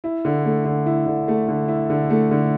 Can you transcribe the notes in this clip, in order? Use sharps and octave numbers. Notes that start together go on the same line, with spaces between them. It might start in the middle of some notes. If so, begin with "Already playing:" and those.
E4
D3
A3
D3
E4
D3
A3
D3
E4
D3
A3
D3